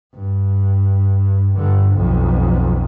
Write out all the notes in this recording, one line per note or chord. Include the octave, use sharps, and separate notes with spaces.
G2
G2 D3
B1 F2